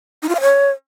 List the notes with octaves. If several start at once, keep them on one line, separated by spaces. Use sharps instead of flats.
D#4
F4
F5
C#5